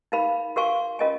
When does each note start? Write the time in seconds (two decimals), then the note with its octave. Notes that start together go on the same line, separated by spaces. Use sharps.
0.12 D#4 A#4 F5 B5
0.56 F#4 A#4 F5 G#5 C#6
0.99 C#4 F4 A#4 D#5 G#5